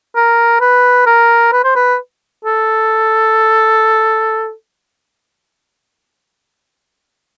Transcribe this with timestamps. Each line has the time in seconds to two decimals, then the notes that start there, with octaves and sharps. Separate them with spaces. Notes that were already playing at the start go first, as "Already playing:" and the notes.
0.15 A#4
0.61 B4
1.06 A#4
1.52 B4
1.64 C5
1.75 B4
2.45 A4